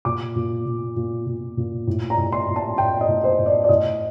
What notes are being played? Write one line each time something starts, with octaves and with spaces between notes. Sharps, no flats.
A#2 D6
A#2
A#2
A#2
A#2
A#2
A2
A#5
A2
C6
A2
A5
A2 G5
D#5
A2
C5
A2
D5
D5
A2 D#5